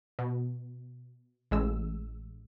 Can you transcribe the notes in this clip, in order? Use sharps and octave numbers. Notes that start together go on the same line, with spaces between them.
B2
A1 G#3 E6